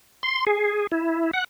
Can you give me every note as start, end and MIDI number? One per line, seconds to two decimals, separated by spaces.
0.23 0.45 84
0.47 0.87 68
0.92 1.31 64
1.33 1.44 78